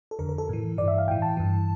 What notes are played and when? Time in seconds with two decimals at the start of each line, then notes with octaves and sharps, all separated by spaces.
0.11 A4
0.19 F2 D3 A#4
0.29 A#4
0.38 A4
0.49 A2 E3
0.78 G2 E3 D5
0.88 E5
0.98 F5
1.08 A2 E3 G5
1.22 A5
1.37 G2 E3